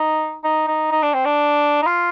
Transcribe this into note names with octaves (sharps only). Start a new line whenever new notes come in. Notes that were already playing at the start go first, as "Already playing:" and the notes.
Already playing: D#4
D#4
D#4
D#4
D4
C4
D4
D#4
F4